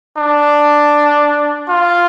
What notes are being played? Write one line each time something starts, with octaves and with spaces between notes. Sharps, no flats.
D4
F4